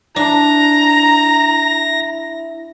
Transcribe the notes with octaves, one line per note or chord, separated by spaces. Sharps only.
D4 E4 A#5 A#6